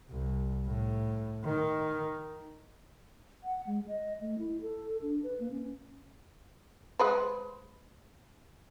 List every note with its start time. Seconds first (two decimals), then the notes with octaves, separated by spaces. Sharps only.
0.10 C2
0.66 A2
1.45 D#3
3.43 F#5
3.67 G#3
3.88 D#5
4.21 A3
4.39 E4
4.61 A4
5.02 D4
5.23 B4
5.40 A#3
5.51 C#4
6.99 G#3 B4 C5